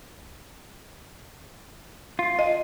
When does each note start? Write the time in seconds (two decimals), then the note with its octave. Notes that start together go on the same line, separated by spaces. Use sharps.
2.19 F4
2.39 D#5